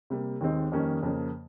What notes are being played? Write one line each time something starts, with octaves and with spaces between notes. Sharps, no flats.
C3 G3 A#3
D#2 D#3 G#3 C4 D#4
F2 D#3 G3 A#3 C#4
F2 C#3 F3 A#3